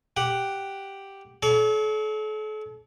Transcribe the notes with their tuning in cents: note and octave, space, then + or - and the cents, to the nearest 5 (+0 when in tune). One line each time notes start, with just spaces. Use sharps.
G4 +0 F#5 +0
A4 -40 C#5 +40